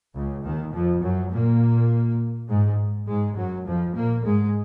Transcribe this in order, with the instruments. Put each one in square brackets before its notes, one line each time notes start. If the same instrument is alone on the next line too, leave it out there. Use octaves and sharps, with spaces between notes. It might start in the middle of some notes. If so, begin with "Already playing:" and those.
[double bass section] C#2 C#3
D#2 D#3
F2 F3
F#2 F#3
A#2 A#3
G#2 G#3
G#2 G#3
F#2 F#3
F2 F3
A#2 A#3
G#2 G#3